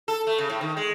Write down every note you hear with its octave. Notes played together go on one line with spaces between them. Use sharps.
A4
A3
C#3
A2
D#3
G#3